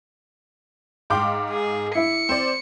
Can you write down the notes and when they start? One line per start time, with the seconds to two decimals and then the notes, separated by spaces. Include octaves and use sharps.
1.10 G#2 F5 G5 C6 D6
1.50 G#4
1.95 E4 E5 C#7
2.29 C4 C5 D5